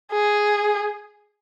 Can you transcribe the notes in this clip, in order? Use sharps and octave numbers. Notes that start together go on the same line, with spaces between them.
G#4